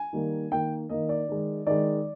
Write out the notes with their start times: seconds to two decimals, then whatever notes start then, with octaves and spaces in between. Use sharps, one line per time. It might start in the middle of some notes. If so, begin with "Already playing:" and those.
Already playing: G#5
0.13 D#3 G3 A#3
0.52 D#3 A#3 G5
0.89 D#3 A#3 D#5
1.09 D5
1.29 D#3 G#3
1.67 D#3 G#3 D5